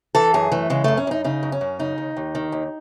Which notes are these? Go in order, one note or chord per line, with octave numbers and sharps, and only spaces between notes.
E3 A4
F#2 G#4
E3 A3
C#3 G#3
F#2 A3
C#4
F#2 D#4
C#3 D#4
F#2
C#4
F#2
C#3 D#4
D#2
D#2
D#3
D#2